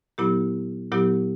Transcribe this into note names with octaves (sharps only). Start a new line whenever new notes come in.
A#2 F#3 B3 E4 G4
A#2 F#3 B3 E4 G4